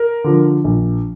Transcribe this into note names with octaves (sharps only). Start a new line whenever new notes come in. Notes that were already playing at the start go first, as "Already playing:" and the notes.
Already playing: A#4
D3 F3
A#1